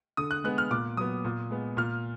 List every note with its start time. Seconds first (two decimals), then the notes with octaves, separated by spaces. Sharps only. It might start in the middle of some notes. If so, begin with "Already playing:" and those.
0.17 D3 D#6
0.31 F#6
0.44 G#3 B3 F#6
0.58 F6
0.71 A#2 D6
0.97 F#3 B3 D#6
1.25 A#2
1.50 G#3 B3
1.77 A#2 F6